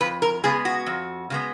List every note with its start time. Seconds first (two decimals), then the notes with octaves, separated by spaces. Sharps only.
0.01 F2 B4
0.22 A#4
0.43 C#3 G#3 B3 G#4
0.65 F#4
0.86 F2
1.30 C#3 G#3 B3